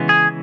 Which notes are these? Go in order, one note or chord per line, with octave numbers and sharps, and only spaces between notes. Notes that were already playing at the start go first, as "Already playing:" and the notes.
Already playing: C#3 E3 G#3 B3
G#4